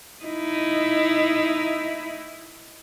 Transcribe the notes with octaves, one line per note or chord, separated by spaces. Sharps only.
D#4 E4